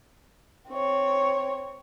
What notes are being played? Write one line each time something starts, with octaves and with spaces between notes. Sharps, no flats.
C4 C#5